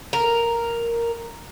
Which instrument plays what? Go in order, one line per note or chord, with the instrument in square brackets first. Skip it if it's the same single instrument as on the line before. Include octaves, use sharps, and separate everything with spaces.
[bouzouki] A#4